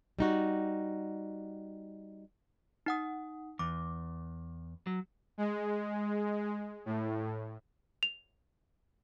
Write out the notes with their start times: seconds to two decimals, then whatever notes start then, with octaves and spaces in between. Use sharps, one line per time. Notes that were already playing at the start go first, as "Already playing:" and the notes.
0.19 G3 D#4 F#4
2.86 D#4 F#5 D#6
3.59 E2 D6
4.87 F#3
5.38 G#3
6.86 A2
8.03 F7